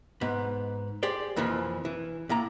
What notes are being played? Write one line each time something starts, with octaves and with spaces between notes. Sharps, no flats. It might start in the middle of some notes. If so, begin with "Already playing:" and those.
G#2 B3
G4 G#4 C5 D5
F2 A#2 E3 F3
E3
A2 A#3 E4 A#5